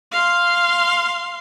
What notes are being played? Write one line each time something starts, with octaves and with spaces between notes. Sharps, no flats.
F5 C6